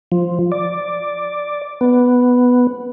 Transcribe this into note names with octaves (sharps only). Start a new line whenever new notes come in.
F3
D5
B3